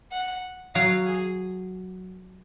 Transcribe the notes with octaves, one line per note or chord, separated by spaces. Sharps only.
F#5
F#3 F5
G#4